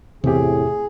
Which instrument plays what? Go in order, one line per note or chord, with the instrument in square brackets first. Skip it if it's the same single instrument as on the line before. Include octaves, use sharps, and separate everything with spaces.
[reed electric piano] E2 G4 [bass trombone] A2 [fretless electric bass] C3 [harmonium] G#4